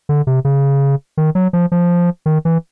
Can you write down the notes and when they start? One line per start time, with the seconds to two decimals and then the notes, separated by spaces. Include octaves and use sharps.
0.09 D3
0.27 C3
0.45 C#3
1.17 D#3
1.35 F#3
1.53 F3
1.72 F3
2.26 D#3
2.45 E3